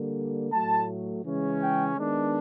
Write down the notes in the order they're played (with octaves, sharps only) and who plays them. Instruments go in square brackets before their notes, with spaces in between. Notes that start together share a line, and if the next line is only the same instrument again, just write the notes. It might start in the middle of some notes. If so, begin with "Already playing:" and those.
Already playing: [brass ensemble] D3 G3 A#3
A2 F#3 A3 A5
C#3 E3 G#3 C#4
G5
D#3 G#3 B3 D4